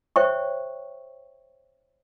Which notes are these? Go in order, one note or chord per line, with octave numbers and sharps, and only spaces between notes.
C5 C#5 E5 G5 C#6